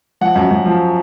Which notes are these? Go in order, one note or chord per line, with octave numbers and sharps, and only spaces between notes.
F3 F#5
F#2
F#2
F3